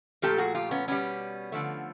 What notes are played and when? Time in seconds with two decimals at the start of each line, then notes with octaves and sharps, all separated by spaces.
0.22 A#2 F3 A3 G4 A4
0.38 F#4 G#4
0.55 F4 G4
0.71 B3 C#4
0.88 B2 G3 B3 C#4
1.52 D3 F3 A3